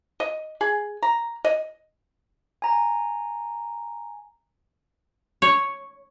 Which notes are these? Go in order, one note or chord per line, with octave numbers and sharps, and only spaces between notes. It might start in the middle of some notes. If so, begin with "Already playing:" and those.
D#5
G#4
A#5
D#5
G#5 A#5
C#5